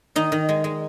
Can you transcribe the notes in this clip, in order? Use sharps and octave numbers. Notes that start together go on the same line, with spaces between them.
D#3 D#4
D#3
G#3
G#3